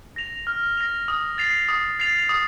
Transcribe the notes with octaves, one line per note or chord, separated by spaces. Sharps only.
A#6 F7
F6
A#6 F7
D#6
A6 C7 F7
D#6
A6 C7 F7
D#6